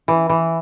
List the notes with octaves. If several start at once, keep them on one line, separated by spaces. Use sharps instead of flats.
E3
E3